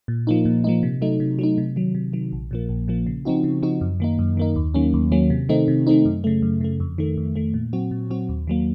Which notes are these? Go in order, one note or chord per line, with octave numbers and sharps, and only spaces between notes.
A#2
F3 A#3 D#4
A#2
F3 A#3 D#4
C3
F#3 A3 D#4
C3
F#3 A3 D#4
C3
D#3 F#3
C3
D#3 F#3
A#1
A#2 F3 A#3
A#1
A#2 F3 A#3
C#3
F3 C4 D#4 F#4
C#3
F3 C4 D#4 F#4
F#2
D#3 A#3 D#4
F#2
D#3 A#3 D#4
D#2
D#3 F#3 A#3 C#4
D#2
D#3 F#3 A#3 C#4
C3
D#3 A3 C4 D#4
C3
D#3 A3 C4 D#4
F#2
C#3 A3
F#2
C#3 A3
F2
D#3 A3
F2
D#3 A3
A#2
F#3 C4 F#4
A#2
F#3 C4 F#4
D#2
D#3 F#3 A#3